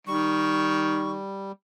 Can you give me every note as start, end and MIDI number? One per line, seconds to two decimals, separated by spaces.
0.07 1.26 51
0.07 1.52 55
0.07 1.12 85